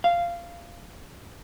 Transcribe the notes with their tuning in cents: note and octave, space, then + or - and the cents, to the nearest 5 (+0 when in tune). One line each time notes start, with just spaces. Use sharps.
F5 -15